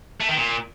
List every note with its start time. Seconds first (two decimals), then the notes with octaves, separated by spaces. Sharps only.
0.20 A3
0.29 D#3
0.37 A#2